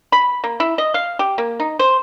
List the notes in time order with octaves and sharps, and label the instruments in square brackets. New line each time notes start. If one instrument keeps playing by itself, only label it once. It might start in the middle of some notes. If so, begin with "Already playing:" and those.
[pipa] B5
A#3
E4
D#5
F5
G4
A#3
D#4
C5